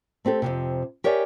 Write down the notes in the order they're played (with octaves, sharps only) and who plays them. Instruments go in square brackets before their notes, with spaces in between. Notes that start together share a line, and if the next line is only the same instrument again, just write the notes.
[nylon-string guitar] A3 C4 G4 A4
F2 G#2 C3
G4 A#4 C#5 D5 E5 G#5